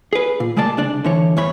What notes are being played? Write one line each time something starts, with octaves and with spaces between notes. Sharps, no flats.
G#4 B4
A#2
C#3 G#3 A#3 D5 A5
C2 C#3 D4 D5
D3 E3 C#5
E2 G2 E3 C#5 B5